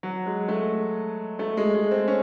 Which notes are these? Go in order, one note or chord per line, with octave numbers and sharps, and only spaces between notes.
F#3
G#3
A3
A3
G#3
G#3
C4
C#4